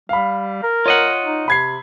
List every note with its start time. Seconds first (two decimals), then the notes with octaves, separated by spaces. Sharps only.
0.09 G3 F5 B5
0.63 A#4
0.86 F4 C#5 D#5 F#5
1.24 D#4
1.48 C3 B5 G#6 C7